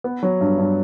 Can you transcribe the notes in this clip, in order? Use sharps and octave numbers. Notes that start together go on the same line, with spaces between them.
B3
F#3
G2
G2